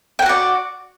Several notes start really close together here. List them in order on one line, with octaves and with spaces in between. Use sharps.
G5 F#5 F#4 D5